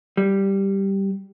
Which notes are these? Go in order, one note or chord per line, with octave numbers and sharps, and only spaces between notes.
G3